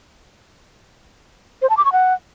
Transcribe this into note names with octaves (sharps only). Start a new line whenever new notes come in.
C5
A5
D6
C#6
F#5